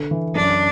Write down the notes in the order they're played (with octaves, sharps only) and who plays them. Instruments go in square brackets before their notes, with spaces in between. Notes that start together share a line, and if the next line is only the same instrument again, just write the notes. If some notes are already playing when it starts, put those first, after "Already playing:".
Already playing: [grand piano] D3 D4 A4
E3
[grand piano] F#2 [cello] D4